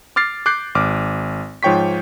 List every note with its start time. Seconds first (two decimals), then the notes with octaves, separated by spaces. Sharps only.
0.16 D6 F6 A6 C7
0.46 D6 F#6 G6 C7
0.75 G#1 D6 F6
1.63 G#2 F3 C#5 G5 C#6 B6